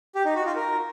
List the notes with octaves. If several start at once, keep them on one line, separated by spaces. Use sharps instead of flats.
G4
D#4
F#4
F4
A#4